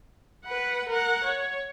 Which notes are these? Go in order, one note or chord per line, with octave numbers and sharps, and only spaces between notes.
B4 F#5
A#4 F#5
C#5